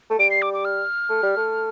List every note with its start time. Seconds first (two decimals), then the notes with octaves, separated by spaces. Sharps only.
0.10 A3
0.19 G3 D7
0.31 C7
0.42 D6
0.53 D6
0.65 F6
1.09 A3
1.23 G3
1.37 A3